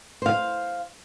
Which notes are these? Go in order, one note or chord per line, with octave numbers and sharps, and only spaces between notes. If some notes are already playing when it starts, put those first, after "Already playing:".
C5 F5